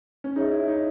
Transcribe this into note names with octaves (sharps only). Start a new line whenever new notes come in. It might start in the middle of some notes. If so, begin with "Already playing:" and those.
C#4
D#4 G#4 C#5 E5
E4
D#4